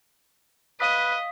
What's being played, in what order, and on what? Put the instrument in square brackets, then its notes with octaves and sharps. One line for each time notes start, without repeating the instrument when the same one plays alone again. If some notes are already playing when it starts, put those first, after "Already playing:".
[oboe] B4 [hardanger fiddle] D#5 [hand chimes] F5 D#6 B6